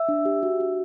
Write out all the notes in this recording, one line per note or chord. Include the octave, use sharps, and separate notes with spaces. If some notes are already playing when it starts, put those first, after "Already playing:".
Already playing: E5 E6
D4
G4
F#4
F#4